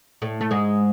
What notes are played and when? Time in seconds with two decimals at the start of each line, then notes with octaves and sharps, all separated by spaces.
0.22 A2 A3
0.41 A3
0.51 G#2 G#3